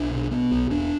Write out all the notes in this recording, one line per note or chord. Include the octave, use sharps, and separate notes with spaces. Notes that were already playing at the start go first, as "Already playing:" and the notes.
Already playing: B1 D4
B2
B2 B3
B1
E1 D4